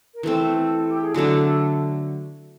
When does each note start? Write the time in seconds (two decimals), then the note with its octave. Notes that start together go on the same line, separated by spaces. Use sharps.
0.14 A#4
0.23 E3 A3 C4 A4
0.87 G4
1.02 G#4
1.14 D3 F#3 A3 D4 A4